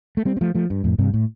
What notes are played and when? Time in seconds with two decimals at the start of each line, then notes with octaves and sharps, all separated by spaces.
0.17 A3
0.25 G3 C4
0.37 C4
0.41 F3 A3
0.55 F3 A3
0.70 G2
0.84 F2 A2
0.99 G2 C3
1.14 A2